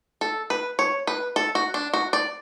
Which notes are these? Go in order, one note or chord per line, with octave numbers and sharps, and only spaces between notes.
A4
B4
C#5
B4
A4
F#4
D4
F#4
D5